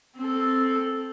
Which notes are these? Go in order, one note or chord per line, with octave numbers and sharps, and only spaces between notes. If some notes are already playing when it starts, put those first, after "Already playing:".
C4 A4